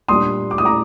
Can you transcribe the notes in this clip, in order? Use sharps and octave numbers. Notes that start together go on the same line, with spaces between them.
A#2 G3 D4 C6 D#6
D6
D#6
A#5 D6